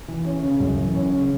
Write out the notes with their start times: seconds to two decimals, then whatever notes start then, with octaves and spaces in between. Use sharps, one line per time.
0.08 E3
0.25 C#4
0.43 C#3
0.60 F#2
0.78 E3
0.95 C#4
1.13 C#3